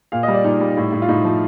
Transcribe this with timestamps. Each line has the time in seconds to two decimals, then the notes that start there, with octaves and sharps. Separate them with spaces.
0.12 A#2 F5
0.23 G3 D#5
0.34 D5
0.44 A#2 D#4
0.60 G3
0.77 A2
0.92 A2
1.02 F4
1.09 A2 D#4
1.25 F3